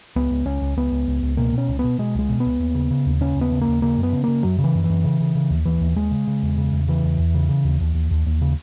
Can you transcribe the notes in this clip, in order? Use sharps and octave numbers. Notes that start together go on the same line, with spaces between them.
C#2 B3
C#2
C#2 C#4
C#2
C#2 B3
C#2
C#2
C#2
B2 A#3
B2
C#4
C#2
B3
B2
B2 G#3
C#2 G#3
B2
B3
C#2
D#2
C#3
C#3
D#2
C#3 C#4
D#2
B3
C#3
A#3
D#2
C#3 A#3
F#2
B3
C#3
C#3 A#3
F#2 F#3
C#3
E3
F#2
E3
F#2
C#3
C#3
C#3
D#2
D#2 E3
D#2
D#2 G#3
C#3
C#3
E2
C#3
E2
C#3 E3
E2
E2
C#3
C#3
D#2
D#2
D#2
D#2
D#2
C#3